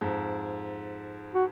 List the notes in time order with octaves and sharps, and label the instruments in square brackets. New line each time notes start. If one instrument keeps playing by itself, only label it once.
[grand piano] F2 G#2
[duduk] F#4